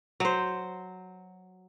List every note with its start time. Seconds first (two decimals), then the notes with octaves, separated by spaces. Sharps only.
0.20 F#3 C5